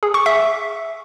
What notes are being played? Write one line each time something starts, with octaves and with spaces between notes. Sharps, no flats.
G#4
C#6
E5